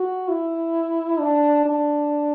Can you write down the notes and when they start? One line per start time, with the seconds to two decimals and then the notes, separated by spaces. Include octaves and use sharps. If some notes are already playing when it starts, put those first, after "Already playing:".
Already playing: F#4
0.29 E4
1.19 D4
1.66 D4